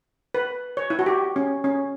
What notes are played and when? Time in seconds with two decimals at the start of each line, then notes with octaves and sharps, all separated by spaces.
0.34 B4
0.77 C#5
0.90 E4
0.99 F#4
1.06 G4
1.36 C#4
1.64 C#4